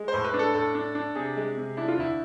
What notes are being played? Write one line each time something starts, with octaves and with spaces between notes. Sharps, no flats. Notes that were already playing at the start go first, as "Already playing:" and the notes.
Already playing: G#3
C5
A2
B4
D4
A4
A2 A4
D4
D4
C3 G#4
G#3
C3
D4 E4
F4
D2 E4